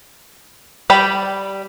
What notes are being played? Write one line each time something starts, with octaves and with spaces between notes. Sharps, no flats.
G3 D5 G5 B5